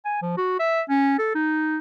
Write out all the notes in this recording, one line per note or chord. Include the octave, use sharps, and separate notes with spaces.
G#5
F3
F#4
E5
C#4
A4
D#4